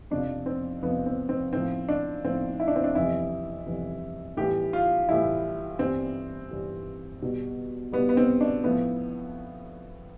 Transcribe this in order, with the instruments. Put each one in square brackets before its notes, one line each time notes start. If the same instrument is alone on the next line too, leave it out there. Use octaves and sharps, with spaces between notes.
[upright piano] F2 C3 F3 D4
C4
F2 C3 F3 B3
C4
C4
A2 F3 C4
D4
A2 F3 C4
E4
D4
C4
D4
F2 C3 E3 G3 E4
F2 C3 E3 G3
A2 E3 G3 G4
F4
A2 E3 G3 E4
G2 E3 G3 C4
G2 E3 G3
B2 G3
G3 B3
B2
B3
C4
D4
A2 F3 B3